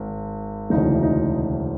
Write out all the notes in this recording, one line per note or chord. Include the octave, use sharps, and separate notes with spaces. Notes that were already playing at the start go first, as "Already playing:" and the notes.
Already playing: G#1
E1 D2 C#3 E3 D#4
D#4